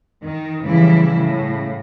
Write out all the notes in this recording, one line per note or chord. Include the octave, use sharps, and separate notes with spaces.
D#3
A2 C#3 E3 F3 G3 E4
A2 C#3